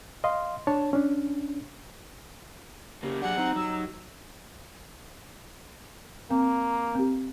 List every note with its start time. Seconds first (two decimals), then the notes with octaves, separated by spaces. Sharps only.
0.24 D#5 F5 C6
0.67 D4 C#5 A5
0.93 C#4 D4
3.03 C#3 A#3 G4
3.22 F#3 D4 F#4 G#4 F#5
3.37 C4 D#4 G4 A#5
3.56 F#3 E6
6.31 A#3 C4
6.95 C4 G4